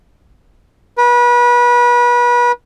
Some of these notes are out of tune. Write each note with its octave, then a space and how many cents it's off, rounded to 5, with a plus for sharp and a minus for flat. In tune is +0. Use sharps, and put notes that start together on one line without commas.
B4 -30